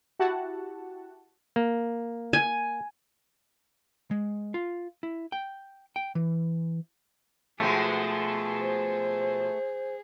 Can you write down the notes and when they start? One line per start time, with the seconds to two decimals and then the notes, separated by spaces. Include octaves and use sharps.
0.19 E4 F#4 G4 F#5 A5
1.56 A#3
2.33 G#5
4.11 G#3
4.54 F4
5.03 E4
5.32 G5
5.96 G5
6.15 E3
7.60 B2 F3 G#3 A3 G#4
8.60 C5